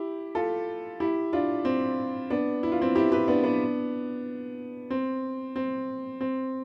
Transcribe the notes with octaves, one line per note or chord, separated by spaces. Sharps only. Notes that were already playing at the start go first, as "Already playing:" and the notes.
Already playing: E4 G4
F4 A4
E4 G4
D4 F4
C4
B3 D4
E4
F4
C4 E4
E4 G4
G4 B4
B3 D4
B3 D4
C4
C4
C4